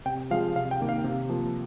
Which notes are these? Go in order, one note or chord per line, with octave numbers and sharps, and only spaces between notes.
C3 G5
F3 G#3 F5
C3 F5
G5
D#3 A#3
F5
C3
F3 A#3